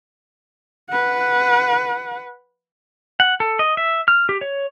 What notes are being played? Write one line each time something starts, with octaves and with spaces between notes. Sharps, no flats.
B4 F#5
F#5
A4
D#5
E5
F6
G4
C#5